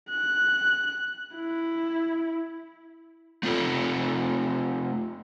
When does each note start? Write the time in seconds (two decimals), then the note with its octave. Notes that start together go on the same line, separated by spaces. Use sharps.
0.11 F#6
1.35 E4
3.43 A3 C4 F4 A4